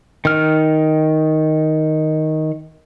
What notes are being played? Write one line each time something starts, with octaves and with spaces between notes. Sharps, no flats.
D#3 F6